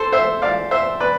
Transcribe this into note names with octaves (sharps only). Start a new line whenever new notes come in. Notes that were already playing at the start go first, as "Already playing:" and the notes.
Already playing: A4 C5
C5 E5
D5 F5
C5 E5
B4 D5